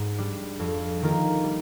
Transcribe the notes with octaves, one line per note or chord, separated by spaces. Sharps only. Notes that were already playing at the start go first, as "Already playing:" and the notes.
Already playing: G#2
G3 D4
F2
D#3 A#3 F4 A#4
G3